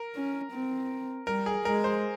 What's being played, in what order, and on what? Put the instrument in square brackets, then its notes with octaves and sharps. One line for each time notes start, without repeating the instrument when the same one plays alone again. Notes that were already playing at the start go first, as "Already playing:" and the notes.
Already playing: [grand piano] A#4
[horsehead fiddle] C#4
C4
[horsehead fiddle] G3 [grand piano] A#4
[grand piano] G#4
[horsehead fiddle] G#3 [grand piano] A#4
[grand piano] C5